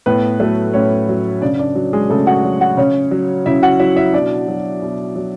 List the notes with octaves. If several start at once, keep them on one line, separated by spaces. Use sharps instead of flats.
A2 B3 B4
F#3 A3 A4
A2 C#4 C#5
F#3
C#3 D4 D5
D4 D5
F#3
G#3 G#4
C#3 A3 A4
F#4 F#5
F#3
F#4 F#5
C#3 C#4 C#5
F#3
C#3 E4 E5
F#4 F#5
F#3 E4 E5
E4 E5
B2 D4 D5
F#3
B2
F#3